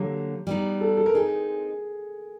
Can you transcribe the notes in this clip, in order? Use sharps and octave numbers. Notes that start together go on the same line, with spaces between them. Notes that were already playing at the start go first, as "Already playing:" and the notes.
Already playing: D3 F#3 A#3 G4
G3 B3 D#4
A4
A4
A#4
G#3 C4 D#4 G#4